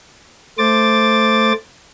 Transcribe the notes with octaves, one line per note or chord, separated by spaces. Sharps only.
A3 C5 D6 A6